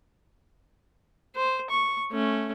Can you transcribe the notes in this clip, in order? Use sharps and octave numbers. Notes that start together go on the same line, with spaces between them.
C5
C#6
A3 C#4